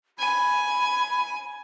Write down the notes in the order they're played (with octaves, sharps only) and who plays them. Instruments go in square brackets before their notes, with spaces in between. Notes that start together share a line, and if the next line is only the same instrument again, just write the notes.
[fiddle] G#5 [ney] B5